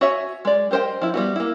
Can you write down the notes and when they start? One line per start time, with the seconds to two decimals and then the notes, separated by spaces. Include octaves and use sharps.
0.01 F#4 C#5 E5 G#5
0.45 G#3 D5
0.71 G4 A#4 C5 D#5 G5
1.01 F3 E4
1.14 G3 B3 F#4
1.36 A#3 E4